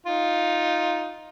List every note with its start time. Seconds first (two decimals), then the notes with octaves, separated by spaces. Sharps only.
0.06 D#4 F4